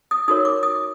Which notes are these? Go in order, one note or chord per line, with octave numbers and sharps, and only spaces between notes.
D#6
D#4 F#4 A#4 C#5 D#6
D6
D#6